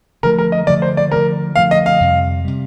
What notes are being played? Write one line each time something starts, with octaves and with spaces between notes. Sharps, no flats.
D3 F3 A3 A#4
A#4
D#5
D3 F3 A3 D5
C5
D5
D3 F3 A3 A#4
D3 F3 A3 F5
D#5
F5
F2 C3 G3
C3 G3